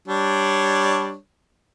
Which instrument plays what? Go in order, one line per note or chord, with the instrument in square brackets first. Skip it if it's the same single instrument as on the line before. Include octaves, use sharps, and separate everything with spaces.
[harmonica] G3 D4 C#5